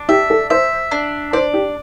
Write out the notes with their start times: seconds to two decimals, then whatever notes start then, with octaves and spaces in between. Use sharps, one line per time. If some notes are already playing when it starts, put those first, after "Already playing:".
Already playing: D4
0.09 G4 E5
0.30 A4
0.50 C5 E5
0.91 D4
1.33 C5 D5
1.54 G4